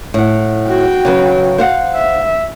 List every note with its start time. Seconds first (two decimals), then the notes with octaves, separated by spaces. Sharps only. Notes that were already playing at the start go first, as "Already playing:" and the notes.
0.14 A2 F#5
0.68 F#4 G5
1.05 C#3 F#3 B4
1.58 C5 F5 F#5
1.96 E5